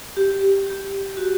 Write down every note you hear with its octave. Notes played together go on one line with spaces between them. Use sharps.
G4
G4
F#4